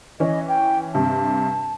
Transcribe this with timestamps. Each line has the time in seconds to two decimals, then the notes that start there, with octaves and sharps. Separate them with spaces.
0.20 E3 C#4 D#5
0.48 G5
0.94 G2 C3 A5